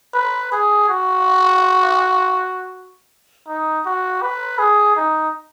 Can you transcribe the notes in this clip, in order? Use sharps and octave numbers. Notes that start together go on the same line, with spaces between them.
B4
G#4
F#4
D#4
F#4
B4
G#4
D#4